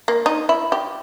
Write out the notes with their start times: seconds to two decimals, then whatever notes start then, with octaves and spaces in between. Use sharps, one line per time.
0.08 A#3
0.26 D#4
0.49 E4
0.72 G4